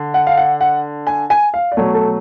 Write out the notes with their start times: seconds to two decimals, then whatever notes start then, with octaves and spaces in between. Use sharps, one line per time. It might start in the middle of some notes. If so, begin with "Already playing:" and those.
Already playing: D3
0.14 F#5
0.27 F5
0.37 F#5
0.61 F#5
1.07 G#5
1.30 G#5
1.54 F5
1.72 D5
1.77 B2 F#3 A3 C#5
1.94 A4